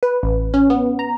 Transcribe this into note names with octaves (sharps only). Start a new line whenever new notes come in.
B4
A1
C#4
B3
A#5